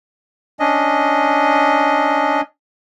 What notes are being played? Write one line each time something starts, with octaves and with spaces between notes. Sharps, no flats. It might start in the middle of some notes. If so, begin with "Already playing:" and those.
C#4 D4 D#5